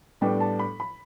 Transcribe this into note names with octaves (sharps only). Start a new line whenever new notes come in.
A2 G3 B3 D4 G5
A5
B5
B5